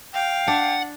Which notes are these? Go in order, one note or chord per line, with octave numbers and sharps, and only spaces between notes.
F5 G5
D4 F#5